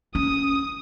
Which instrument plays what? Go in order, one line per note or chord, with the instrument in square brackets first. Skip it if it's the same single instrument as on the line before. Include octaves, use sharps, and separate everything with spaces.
[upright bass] C#4 [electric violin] D#6